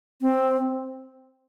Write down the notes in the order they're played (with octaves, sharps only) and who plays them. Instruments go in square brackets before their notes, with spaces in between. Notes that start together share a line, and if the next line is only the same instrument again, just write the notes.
[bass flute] C4